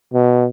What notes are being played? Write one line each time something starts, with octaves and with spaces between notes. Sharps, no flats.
B2